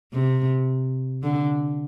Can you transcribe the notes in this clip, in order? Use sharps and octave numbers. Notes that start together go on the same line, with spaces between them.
C3
D3